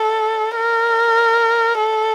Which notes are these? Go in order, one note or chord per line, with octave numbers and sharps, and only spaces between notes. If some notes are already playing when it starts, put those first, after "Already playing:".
Already playing: A4
A#4
A4